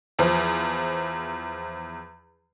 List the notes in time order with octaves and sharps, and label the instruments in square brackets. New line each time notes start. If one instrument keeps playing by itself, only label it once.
[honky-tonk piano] E2 F3